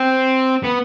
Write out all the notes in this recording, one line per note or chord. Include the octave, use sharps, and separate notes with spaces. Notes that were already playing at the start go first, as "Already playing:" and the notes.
Already playing: C4
B3